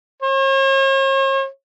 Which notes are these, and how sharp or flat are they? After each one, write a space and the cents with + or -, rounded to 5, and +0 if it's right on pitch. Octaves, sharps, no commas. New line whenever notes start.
C#5 -45